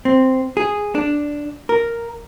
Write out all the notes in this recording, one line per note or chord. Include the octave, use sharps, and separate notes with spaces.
C4
G#4
D4
A#4